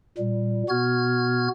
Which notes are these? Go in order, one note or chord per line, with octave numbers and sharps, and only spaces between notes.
A#2 G3
B2 B3 F#4 F6 G#6